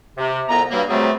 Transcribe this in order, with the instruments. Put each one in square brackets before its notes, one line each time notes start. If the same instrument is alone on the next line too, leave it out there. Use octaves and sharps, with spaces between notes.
[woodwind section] C3
C2 F2 B3 A#5
G2 F#3 G3 A#3
C3 F#3 G3 A3 C4 G#4